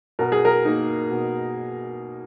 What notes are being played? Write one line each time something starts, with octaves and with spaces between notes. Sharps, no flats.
B2 A#4
G#4
A#4
A#3 D#4
B2